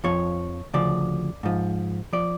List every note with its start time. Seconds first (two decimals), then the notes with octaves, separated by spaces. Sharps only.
0.04 F2 F3 C#5
0.73 D2 C#3 F3 D5
1.43 G#2 F3
2.13 F3 D5